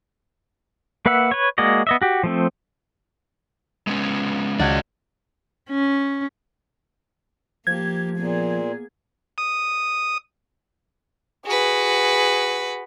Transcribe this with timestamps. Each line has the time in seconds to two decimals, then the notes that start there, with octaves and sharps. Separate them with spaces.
1.06 A#3 B4 E5 F#5 E6
1.31 B4 C#5
1.58 G#3 A#3 F#4 D5 D#5
1.87 B3 D#5 E5
2.02 F#4 G4
2.24 F3 A3 C4
3.87 G#3 B3 C#4
4.59 C#2 F#4 D5 F#5 G#6
5.69 C#4
7.67 F3 A#3 G4 G#6
8.17 A#2 A#3 B3 G#4
9.38 D#6
11.46 F#4 G#4 B4